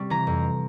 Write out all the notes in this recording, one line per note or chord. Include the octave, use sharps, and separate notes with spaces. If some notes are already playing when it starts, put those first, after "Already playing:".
Already playing: C3 G3 C#6
E3 A#5
F2